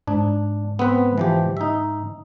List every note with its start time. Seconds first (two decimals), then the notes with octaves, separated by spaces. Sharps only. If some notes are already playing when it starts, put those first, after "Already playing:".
0.07 G#2 D4
0.79 B3 C4 B4
1.18 E3 F3 G4
1.57 D#4 E5